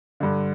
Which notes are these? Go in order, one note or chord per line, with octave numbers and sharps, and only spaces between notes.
G2 D3